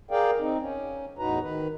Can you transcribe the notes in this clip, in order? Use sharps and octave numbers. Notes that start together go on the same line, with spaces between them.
G#4 A#4 D5 F5 G5
C4 D#4
C#4
E2 A2 D#4 F#4 B4 A#5
D#3 B4